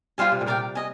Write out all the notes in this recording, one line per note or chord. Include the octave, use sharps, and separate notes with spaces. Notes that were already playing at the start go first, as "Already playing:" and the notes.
G3 F4 C5 F5 G#5
C3
A#2
C3 A#4 D5 G5
D#5 G#5